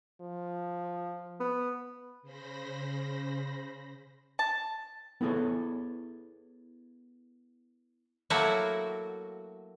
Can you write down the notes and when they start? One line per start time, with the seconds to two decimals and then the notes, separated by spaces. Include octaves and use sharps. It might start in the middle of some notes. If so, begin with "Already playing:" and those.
0.21 F3
1.40 B3
2.22 C#3 C5 B5 A#6
4.39 A5
5.21 B3 E4 G#4 A4 C#5
8.30 F#3 A3 A#3 E4 F#4